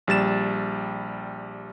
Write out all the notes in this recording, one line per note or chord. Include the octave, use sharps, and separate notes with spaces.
A#1 G3 A6 E7